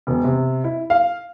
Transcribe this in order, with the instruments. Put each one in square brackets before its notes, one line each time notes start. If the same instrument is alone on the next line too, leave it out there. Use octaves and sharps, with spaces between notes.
[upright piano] E1
C3
E4
F5